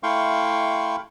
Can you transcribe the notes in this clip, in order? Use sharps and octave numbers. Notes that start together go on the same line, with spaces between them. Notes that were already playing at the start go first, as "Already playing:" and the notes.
A3 E4 F5 G5 C6 C#6